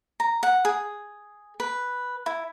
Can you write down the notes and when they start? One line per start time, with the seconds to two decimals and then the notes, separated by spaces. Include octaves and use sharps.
0.20 A#5
0.43 F#5
0.65 G#4
1.60 B4
2.26 E4